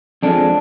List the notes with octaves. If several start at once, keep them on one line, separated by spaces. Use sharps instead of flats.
F2 D3 F3 G#3 D4